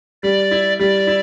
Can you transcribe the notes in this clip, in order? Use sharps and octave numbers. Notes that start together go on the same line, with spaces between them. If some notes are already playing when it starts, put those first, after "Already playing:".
G3 D5
E4
G3 D5
E4